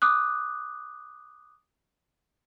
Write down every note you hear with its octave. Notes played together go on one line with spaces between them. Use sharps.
D6 D#6 F#6